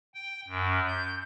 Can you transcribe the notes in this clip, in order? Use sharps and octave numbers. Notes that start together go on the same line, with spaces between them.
G5
F#2
G6